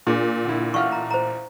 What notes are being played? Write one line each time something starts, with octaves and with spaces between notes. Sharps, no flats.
A#2 D4 G#4 D6
D3 E4
A1 F5 F#5 C#6 F6
A#5
C5 A#5